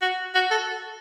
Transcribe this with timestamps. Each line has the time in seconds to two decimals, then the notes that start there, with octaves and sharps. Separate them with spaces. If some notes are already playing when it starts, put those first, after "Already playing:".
0.02 F#4
0.35 F#4
0.51 A4